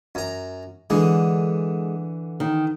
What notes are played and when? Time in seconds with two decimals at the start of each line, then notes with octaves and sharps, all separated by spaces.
0.15 F#2 A#5
0.90 D3 E3 G#3
2.40 D#3